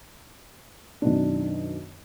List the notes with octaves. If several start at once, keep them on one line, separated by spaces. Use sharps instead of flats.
F#2 B2 D#3 D4